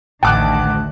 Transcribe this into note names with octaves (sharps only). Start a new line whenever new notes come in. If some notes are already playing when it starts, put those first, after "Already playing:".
A1 D2 D#3 F#5 G5 A5 D6 F#6